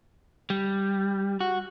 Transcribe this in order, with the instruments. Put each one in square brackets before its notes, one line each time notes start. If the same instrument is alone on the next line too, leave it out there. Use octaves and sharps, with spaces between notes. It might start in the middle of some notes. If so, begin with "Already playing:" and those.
[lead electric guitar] G3
F#4